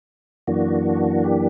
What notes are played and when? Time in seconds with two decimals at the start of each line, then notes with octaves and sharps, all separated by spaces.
0.47 F#2 E3 A#3 D4 F#4
1.24 G4